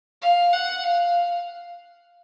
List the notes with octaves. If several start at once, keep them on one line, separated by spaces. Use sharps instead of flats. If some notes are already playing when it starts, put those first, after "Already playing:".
F5
F#5
F5